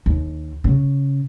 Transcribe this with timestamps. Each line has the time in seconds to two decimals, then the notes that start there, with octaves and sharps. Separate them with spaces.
0.06 D#2
0.64 C#3